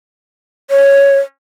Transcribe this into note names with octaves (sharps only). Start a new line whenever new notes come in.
C#5